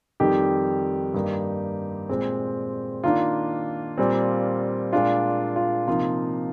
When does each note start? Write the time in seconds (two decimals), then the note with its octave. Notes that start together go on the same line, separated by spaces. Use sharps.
0.20 F2 D#3 G3 G4
1.14 G2 D#3 A#3 D#4
2.09 A#2 G#3 C4
3.04 D#3 A#3 D4 F4
3.98 A#2 G3 C4
4.93 A#2 G#3 D4 F4
5.56 F4
5.87 C3 F3 A#3 D#4 F4